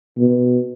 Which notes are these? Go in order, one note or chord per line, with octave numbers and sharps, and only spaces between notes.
B2